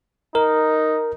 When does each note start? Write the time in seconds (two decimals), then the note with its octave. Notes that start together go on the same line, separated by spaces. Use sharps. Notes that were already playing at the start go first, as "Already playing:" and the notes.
0.35 D#4 A#4